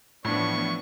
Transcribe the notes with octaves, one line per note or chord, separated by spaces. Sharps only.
A2 E3 F3 B3 D4 C#6